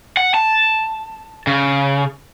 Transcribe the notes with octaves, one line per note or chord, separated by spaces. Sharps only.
F#5
A5
C#3